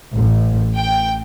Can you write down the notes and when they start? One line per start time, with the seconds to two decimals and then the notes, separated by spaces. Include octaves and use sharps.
0.15 A1
0.76 G5